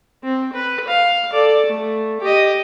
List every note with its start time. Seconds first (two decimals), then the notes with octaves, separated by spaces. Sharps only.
0.23 C4
0.53 B4
0.88 F5
1.32 A4 D5
1.66 A3
2.21 G4 D#5